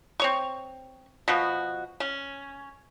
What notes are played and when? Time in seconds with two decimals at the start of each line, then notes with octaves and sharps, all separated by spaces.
0.20 C4 C#5 C#6
1.28 B2 F3 F#4
2.00 C#4